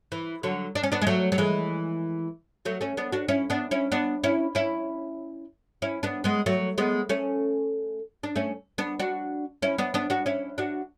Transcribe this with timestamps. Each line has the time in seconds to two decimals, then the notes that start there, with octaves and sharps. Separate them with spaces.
0.12 E3
0.43 D3 F#3
0.75 D4
0.83 C#4
0.92 B3 D4
1.02 G#3
1.07 F#3 A3
1.32 F#3
1.38 E3 G#3
2.65 F#3 A3
2.81 A3 C#4
2.97 B3 D4
3.12 D4 F#4
3.28 C#4 E4
3.50 B3 D4
3.71 C#4 E4
3.92 B3 D4
4.24 C#4 E4
4.55 C#4 E4
5.82 C#4 E4
6.03 B3 D4
6.24 G#3 B3
6.46 F#3 A3
6.78 G#3 B3
7.09 A3 C#4
8.23 D4
8.36 A3 C#4
8.78 B3 D4
9.00 D4 F#4
9.62 C#4 E4
9.78 B3 D4
9.94 B3 D4
10.10 D4 F#4
10.26 C#4 E4
10.58 D4 F#4